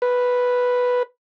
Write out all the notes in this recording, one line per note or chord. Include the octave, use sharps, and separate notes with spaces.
B4